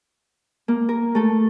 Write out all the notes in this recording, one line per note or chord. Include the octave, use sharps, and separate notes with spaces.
A#3
A#4
A3 A4